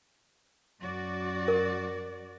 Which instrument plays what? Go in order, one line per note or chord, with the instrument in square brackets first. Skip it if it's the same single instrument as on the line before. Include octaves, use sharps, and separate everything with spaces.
[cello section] F#2 F#4 D5
[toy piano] A#4